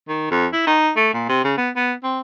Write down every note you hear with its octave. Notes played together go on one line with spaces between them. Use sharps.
D#3
F2
E4
D#4
A3
A#2
C3
C#3
B3
B3
C4